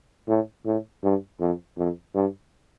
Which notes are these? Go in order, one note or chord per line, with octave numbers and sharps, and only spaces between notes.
A2
A2
G2
F2
F2
G2